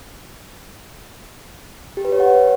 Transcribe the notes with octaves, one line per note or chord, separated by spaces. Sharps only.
G4
B4
C#5
F#5